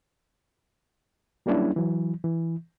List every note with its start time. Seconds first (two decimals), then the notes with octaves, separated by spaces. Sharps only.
1.46 F#3 G3 A#3 C#4 D4 E4
1.76 E3 F#3
2.24 E3